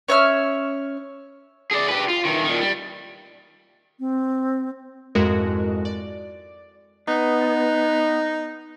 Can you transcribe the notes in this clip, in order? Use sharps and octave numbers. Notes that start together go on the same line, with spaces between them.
C#4 C#5 E5 F6
G#4 D5
G4 B4
F4
D#3 E3
A#2 D#3
G3
C4
F2 G#2 G#3 E4 F#4 A#4
D5
B3 D#4